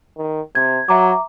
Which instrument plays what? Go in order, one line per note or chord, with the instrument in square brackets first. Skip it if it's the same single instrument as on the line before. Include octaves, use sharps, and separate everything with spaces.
[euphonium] D#3
[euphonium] C3 [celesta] G#6
[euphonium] F#3 [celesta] E5 A#5 D6